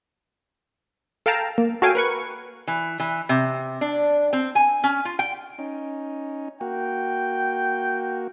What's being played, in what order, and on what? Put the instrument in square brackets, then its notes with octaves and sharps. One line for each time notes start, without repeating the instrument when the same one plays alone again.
[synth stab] A4 F5 G5 A5 A#5
A#3
F#4 A4 C#5 F5 G5 G#5
A#4 B4 C#6
[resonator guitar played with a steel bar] E3
E3
C3
D4
C4
G#5
C#4
F4
G5
[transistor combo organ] C#4 D#4
[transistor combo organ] A#3 F#4 [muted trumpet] G5